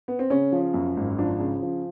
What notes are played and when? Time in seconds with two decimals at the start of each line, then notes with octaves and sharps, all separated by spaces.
0.08 B3
0.19 C4
0.30 C#3 C#4
0.52 F3
0.74 F#2
0.97 G#1
1.18 F3 D4
1.40 C#3
1.63 F3